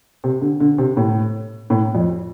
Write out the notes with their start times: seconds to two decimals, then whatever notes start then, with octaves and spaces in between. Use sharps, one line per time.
0.24 C3
0.41 D3
0.60 D3
0.78 C3
0.97 A2
1.70 A2
1.95 F2